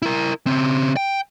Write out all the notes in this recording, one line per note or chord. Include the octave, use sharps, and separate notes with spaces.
E4 A#4
C#3 C4
G5